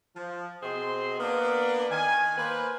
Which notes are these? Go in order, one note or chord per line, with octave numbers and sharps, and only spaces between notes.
F3
B2 C4 G#4 C5 D#5 C6
A#3 B3 D4
D#3 G#5
A#3 B4 C5